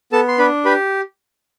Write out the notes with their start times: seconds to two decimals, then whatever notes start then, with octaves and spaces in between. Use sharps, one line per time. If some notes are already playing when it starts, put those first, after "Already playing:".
0.12 B3 A4 A5
0.28 C6
0.38 D4 B4 B5
0.65 G4 B4 B5